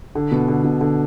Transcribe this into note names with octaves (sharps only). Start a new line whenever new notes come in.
D3
B2
D3
B2
D3